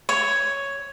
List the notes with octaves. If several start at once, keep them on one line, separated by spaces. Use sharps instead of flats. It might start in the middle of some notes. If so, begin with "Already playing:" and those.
C#5